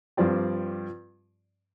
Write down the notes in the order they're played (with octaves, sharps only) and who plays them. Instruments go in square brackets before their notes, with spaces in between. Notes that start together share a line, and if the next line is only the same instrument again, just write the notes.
[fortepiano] G2 F3 C4 G4 D5